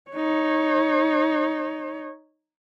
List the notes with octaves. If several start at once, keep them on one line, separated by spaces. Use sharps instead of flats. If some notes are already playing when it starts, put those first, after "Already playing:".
D#4 C#5